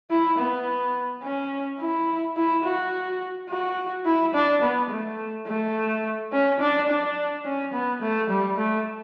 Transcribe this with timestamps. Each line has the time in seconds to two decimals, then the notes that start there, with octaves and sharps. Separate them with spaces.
0.10 E4
0.39 B3
1.22 C#4
1.80 E4
2.37 E4
2.65 F#4
3.49 F#4
4.06 E4
4.34 D4
4.62 B3
4.90 A3
5.47 A3
6.32 C#4
6.60 D4
6.89 D4
7.45 C#4
7.73 B3
8.02 A3
8.30 G3
8.58 A3